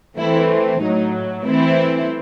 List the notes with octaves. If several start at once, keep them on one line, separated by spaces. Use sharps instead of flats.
E3 A3 C4 E4
A2 F#3 A3 D#4
E3 A3 C4 E4